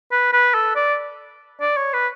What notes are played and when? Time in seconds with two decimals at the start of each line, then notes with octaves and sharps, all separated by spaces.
0.12 B4
0.33 B4
0.54 A4
0.76 D5
1.61 D5
1.77 C#5
1.94 B4